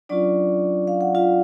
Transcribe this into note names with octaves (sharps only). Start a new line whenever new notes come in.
F#3 C#4 D4 F4 D5
F5
F#5
F4 F5